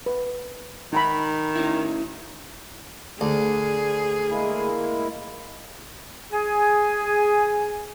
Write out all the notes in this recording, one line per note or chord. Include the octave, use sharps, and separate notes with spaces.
B4
D#3 D#4 A#5 B5
C#4 E4
D2 G#4
G#3 A#3 E4
G#4 G#5